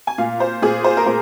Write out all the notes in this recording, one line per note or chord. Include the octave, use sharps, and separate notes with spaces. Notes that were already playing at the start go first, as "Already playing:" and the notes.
G#5
A#2 F5
C5
A#2 G#4
C5
A#4
A#2 C5